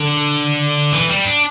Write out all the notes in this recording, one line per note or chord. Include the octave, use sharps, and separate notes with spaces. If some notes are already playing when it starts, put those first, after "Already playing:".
Already playing: D3
E3
G3
D4